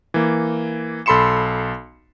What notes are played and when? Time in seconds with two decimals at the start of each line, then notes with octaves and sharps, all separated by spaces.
0.14 E3 A#3
1.06 B1 A4 B5 C6 C#7 E7